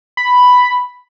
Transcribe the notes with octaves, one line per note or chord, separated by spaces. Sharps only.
B5